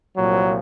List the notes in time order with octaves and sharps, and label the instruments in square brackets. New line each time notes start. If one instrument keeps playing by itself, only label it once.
[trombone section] C2 A#2 F3 F#3